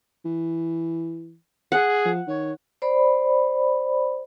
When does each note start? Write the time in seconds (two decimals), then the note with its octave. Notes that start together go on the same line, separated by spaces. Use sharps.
0.25 E3
1.72 G#4 F#5
2.05 F3
2.27 D#3 C#5
2.82 C5 D5 B5